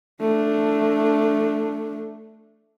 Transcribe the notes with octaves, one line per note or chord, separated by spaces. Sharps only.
A3 D4